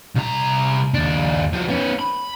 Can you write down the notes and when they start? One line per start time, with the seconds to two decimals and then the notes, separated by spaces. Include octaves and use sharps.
0.15 C2 A#5
0.94 D#2 D4
1.53 F3 F#4
1.68 B3 C#4
1.99 B5